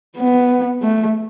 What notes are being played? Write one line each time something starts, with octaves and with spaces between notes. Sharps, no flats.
B3
A3